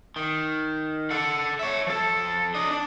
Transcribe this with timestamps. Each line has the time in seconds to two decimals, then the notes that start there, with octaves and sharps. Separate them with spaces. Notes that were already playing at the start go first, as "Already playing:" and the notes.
0.16 D#3
1.11 A4 F#5
1.59 C#5 E5
1.87 F3 A4
2.54 D4 D#5
2.71 D4